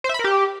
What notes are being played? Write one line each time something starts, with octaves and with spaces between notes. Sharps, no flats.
C5
E5
B5
A#4
G4